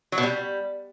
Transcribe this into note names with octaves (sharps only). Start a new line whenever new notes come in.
F#3
B2
G3